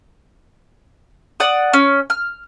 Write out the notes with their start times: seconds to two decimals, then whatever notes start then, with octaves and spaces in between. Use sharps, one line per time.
1.40 D5 F#5 D#6
1.73 C#4
2.10 F6